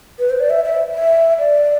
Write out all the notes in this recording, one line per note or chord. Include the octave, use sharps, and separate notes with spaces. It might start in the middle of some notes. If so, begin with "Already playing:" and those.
B4
C5
D5
E5
E5
E5
D5